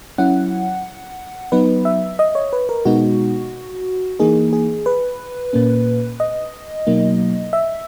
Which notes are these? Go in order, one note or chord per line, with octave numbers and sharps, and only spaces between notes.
F#3 C#4 E4 F#5
F#3 B3 D#4 B4
E5
D#5
C#5
B4
A#4
B2 G#3 B3 D#4 F#4
E3 A#3 D#4 G#4
G#4
B4
A#2 A#3 C#4
D#5
B2 F#3 A#3 D#4
E5